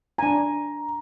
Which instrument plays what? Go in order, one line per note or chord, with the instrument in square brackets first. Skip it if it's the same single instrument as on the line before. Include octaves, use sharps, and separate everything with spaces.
[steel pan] D4 G#5 [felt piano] A#5